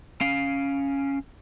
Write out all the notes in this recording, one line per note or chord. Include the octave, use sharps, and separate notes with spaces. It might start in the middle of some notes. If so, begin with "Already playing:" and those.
C#4 F5